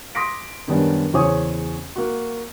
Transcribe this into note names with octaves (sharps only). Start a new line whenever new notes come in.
C6 D6 D#6 A#6 B6 D7
F#2 D#3 G3 B3 C#4 D4
E2 C#3 C5 C#5 G#5 D#6
A#3 F#4